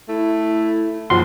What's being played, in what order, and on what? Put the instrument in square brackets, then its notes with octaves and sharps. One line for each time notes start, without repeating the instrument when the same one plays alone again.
[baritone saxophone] A3 [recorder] E4
[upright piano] F#1 F3 [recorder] C5 [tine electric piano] C6